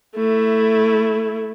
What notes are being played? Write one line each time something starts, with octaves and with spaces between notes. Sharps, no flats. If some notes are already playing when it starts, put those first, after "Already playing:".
A3 E4